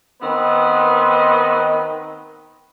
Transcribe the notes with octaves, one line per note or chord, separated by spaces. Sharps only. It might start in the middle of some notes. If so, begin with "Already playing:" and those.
D#3 B3 C4 B4 D#5